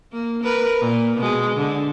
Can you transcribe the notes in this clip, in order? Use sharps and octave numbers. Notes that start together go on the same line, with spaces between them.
A#3
A#4 B4
A#2
B2 G#3
D3